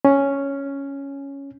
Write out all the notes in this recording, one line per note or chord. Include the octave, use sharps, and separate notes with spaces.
C#4